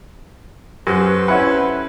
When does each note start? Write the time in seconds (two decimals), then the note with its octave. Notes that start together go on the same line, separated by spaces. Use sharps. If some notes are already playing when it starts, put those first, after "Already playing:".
0.87 F#2 G4 A4 B4 C5
1.28 C#4 E4 F#5 B5